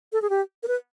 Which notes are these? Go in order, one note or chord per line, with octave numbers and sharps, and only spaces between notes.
A4
G#4
G4
A#4
B4